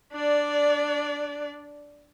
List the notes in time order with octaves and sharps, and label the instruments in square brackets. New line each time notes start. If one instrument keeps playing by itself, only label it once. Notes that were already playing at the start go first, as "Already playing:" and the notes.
[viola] D4 D5